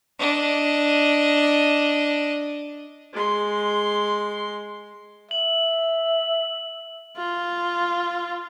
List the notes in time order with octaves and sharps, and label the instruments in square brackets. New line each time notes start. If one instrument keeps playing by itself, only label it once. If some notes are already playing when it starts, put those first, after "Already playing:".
[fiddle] D4 D#5
[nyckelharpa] G#3 C6
[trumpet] E5 [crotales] F#7
[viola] F4